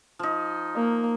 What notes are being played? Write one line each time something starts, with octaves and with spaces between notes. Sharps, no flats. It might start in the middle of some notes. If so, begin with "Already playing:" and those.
F3 D#4
A#3